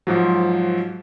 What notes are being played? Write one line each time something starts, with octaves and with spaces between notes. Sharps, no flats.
G#2 F3 F#3